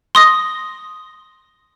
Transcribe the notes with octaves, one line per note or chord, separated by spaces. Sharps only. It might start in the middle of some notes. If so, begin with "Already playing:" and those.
C6 D#6 A#6